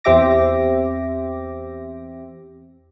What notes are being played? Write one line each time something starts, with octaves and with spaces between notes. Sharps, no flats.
E2 C4 G4 E5 D6 A#6